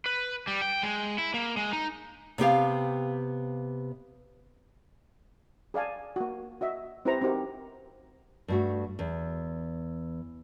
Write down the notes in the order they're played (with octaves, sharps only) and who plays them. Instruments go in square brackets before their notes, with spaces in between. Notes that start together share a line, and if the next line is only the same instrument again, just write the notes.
[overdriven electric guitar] B4
G3
G5
G#3
E4
A#3
G#3
D#4
[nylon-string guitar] C3 B3 G4 F5
[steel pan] G#4 D5 F5 G#5 A5
A#3 F#4
F#4 D#5 E5
C4 E4 G4 B4 C5 A#5
C4 D#4 F#4 G4 A#4
[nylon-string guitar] G2 A3 F#4
E2